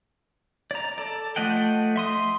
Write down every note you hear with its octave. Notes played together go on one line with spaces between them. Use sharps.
D5 A#5
A4 D5
F3 A3 D#5 F#5 G5
E5 C6 D#6